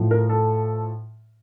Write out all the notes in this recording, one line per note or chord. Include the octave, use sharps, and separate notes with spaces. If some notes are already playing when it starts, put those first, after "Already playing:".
Already playing: A2 F3
A#4
A4